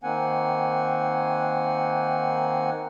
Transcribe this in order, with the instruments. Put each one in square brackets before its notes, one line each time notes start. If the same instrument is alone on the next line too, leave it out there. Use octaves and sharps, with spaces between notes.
[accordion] D#3 A#3 C4 F#5 G#5